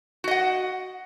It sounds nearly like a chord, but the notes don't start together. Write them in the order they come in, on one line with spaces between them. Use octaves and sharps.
F#4 D#5 F#5